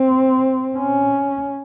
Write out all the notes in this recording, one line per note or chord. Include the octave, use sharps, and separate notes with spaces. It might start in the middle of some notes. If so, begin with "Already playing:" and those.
Already playing: C4
C#4